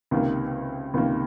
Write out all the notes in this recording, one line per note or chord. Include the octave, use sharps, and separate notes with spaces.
C#2 C3 D#3 A#3
C#2 C3 D#3 A#3